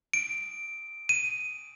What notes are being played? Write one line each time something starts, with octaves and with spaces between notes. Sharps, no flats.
D7
D#7